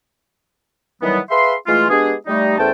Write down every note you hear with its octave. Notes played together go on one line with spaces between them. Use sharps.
D#3 E3 F#3 G3 B3
G#4 B4 E5 F5 C6
E3 G#3 A3 F4
G#3 B3 D4 G4 G#4
G3 A3 D#4
E2 A3 C#4 C5 G5 A5